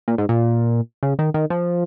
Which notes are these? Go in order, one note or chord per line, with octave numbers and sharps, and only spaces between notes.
A#2
G#2
A#2
C#3
D#3
D#3
F3